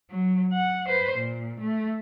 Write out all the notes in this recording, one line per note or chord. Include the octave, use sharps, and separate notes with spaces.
F#3
F#5
B4 C5
A#2
A3